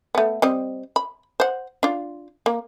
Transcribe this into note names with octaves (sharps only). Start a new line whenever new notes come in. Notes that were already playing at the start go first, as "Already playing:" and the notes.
A3 B3
G3 C4 D#5
B5
C5 F#5
D4 F4
A#3